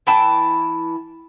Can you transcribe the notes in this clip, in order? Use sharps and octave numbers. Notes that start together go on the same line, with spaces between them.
E3 E4 G5 A5